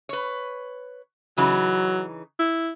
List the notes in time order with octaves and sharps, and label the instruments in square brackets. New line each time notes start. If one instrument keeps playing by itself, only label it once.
[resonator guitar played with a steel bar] B4 C#5
[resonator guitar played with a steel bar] C#3 E3 D#4 [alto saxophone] F#3
[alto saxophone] E4